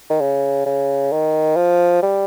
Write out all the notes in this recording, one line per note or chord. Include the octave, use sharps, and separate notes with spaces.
D#3
C#3
C#3
D#3
F3
G3